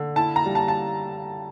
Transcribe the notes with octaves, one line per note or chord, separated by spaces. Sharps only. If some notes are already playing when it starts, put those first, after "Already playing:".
Already playing: D3
E4 A5
A#5
G3
A5
A5